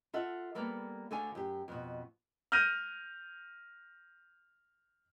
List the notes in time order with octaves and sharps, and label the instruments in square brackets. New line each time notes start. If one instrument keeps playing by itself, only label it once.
[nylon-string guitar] F4 A4 E5 F#5
G3 A#3 B3 A4
D2 D3 A4 F5 G#5
F#2 G4
F2 B2
[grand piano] F6 G6 A#6 D#7